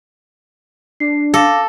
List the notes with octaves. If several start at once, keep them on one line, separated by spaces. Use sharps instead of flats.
D4 C7
A4 F5 D6 A#6